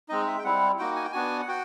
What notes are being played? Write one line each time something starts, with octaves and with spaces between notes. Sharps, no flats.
G#3 C4 D#4 D#5
E5
G5
G3 C4 E4 F#5
A#3 D#4 F#4 G5
G#5
G5
B3 D4 F#4 G#5
F#5
F#4 G5